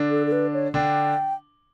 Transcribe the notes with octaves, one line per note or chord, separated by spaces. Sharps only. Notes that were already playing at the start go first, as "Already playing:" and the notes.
Already playing: D3 D4
A4
A4
B4
C#5
D3 D4 G5